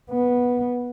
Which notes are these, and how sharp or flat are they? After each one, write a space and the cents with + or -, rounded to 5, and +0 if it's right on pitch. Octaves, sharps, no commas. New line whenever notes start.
B3 -10